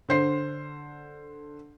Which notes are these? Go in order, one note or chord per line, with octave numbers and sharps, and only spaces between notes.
D3 C5 C7